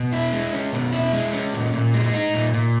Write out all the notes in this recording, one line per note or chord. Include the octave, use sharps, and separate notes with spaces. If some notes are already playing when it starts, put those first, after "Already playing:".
Already playing: B2
E4
G#3
C#4
B2
E4
G#3
C#4
A#2
A#2
G#3
D#4
A#2
A#2